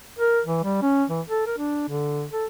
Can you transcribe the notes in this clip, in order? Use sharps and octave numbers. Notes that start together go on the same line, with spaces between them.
A#4
E3
G3
C#4
E3
A4
A#4
D4
D3
A4